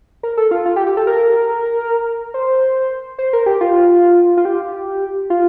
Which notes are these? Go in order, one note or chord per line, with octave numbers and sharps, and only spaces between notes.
A#4
A4
F4
F4
G4
G4
A4
A#4
C5
C5
A#4
G4
F4
F4
G4
F4